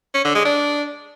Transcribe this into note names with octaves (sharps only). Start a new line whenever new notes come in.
C#4
D3
G#3
D4